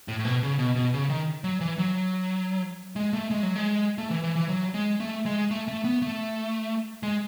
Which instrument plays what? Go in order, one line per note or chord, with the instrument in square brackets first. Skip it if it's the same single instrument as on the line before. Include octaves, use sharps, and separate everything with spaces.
[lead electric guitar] A2
A2
B2
C#3
B2
B2
C#3
D#3
F#3
E3
F#3
G#3
A3
G#3
F#3
G#3
A3
E3
E3
E3
F#3
G#3
A3
G#3
A3
A3
B3
A3
G#3